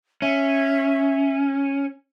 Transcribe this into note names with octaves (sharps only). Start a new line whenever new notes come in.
C#4 E5